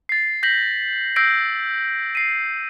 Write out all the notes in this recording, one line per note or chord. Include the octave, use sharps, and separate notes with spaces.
A6 C7
G6 A#6 B6 F#7
E6 G6 A#6 C7 D7
C7 D#7